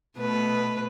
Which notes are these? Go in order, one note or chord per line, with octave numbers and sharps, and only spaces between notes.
B2 A3 B4